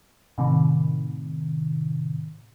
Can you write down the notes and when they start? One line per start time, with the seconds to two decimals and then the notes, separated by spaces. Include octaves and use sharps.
0.38 A2 C3 D#3